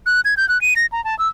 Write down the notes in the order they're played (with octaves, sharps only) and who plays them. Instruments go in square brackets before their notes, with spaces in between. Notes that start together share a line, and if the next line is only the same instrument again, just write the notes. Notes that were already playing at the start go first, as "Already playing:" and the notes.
[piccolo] F#6
G#6
G6
F#6
D#7
A#6
A#5
A5
E6